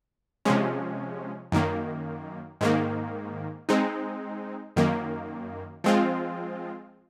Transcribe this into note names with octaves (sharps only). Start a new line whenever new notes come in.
C3 F3 G#3 C#4
F#2 D#3 A#3
G#2 D#3 A#3
G#3 C4 D#4
F#2 D#3 A#3
F3 G#3 C4 F4